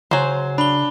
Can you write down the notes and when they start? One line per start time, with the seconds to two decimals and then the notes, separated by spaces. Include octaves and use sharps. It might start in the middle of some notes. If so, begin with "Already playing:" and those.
0.11 C#3 F#3 C5 G#5 C6
0.58 D4 B5 G7